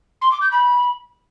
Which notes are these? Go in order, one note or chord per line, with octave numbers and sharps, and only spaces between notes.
C6
D6
G6
B5